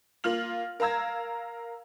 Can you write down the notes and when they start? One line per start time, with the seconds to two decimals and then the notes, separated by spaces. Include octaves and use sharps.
0.24 A#3 F4 F6 F#7
0.80 A#4 F5 A#5 E6 G#6